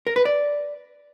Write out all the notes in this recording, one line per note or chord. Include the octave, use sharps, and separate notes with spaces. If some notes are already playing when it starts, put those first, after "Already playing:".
A#4
B4
D5